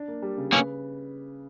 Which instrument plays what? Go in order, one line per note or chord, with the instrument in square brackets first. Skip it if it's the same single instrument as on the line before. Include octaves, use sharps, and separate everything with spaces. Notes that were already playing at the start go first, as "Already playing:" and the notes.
Already playing: [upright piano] D4
A#3
G3
C#3
[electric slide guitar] A#3 C#4 [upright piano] B4